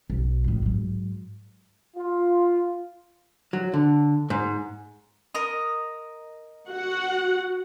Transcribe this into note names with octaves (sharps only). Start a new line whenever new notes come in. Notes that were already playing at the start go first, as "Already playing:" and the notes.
B1
F2 A2
G#2 F#3
F4
F#3
D3
G#2
A#4 D#5
F#4 F#5